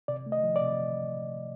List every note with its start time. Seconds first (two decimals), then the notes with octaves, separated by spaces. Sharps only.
0.08 C3 D5
0.26 A3
0.32 D#5
0.43 F3
0.56 D5
0.61 C3